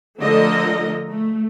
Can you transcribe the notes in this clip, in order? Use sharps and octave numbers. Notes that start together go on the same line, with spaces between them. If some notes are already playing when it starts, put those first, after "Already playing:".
D3 F3 A3 A4 A#4 D#5
A3